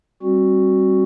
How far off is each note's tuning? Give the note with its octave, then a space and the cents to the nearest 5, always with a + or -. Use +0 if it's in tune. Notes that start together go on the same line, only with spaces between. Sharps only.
G3 +0 C4 +35 F#4 +0